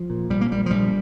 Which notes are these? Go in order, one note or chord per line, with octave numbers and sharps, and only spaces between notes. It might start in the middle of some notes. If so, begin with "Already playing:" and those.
Already playing: F3
A#2
A#1 G3
A#3
A#2 G3
F3
A#1 G3